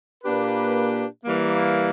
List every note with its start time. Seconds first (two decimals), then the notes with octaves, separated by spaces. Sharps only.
0.24 A#2 A#3 D4 G4 B4
1.25 E3 G3 A#3